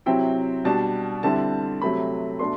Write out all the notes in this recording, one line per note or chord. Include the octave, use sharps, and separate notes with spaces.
C3 F#3 C4 E4 G5
B2 G3 B3 D4 A5
D3 G3 C4 E4 A5
C3 F#3 A3 C4 B5
B2 A3 D4 C6